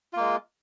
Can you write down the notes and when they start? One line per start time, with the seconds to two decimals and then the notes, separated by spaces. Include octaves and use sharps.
0.13 F4
0.16 A#3
0.20 G#3